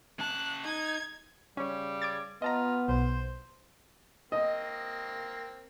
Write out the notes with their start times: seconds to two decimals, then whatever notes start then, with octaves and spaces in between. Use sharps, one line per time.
0.19 C#3 A5 F#6
0.65 D#4 G#6
1.57 C#3 G3 C#4 C#5
2.02 D6 G#6 A6
2.42 B3 F4 D#5 A5 A#5
2.88 B1 C5
4.32 A#3 C4 D#5